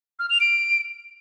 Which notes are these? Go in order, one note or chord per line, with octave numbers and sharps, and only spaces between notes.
F6
F7
D7